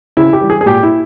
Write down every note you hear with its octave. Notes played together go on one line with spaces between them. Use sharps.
C#3 E4
G4
E3 G3
G#4
G#4
A#2 G4
E4